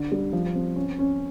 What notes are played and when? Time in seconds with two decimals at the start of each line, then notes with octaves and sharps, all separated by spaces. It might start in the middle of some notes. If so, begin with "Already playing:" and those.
Already playing: D3
0.12 G3
0.33 F3
0.55 C4
0.76 C#4
0.99 C#4